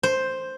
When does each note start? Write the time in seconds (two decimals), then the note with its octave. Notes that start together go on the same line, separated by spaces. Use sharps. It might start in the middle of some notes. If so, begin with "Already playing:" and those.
0.03 C5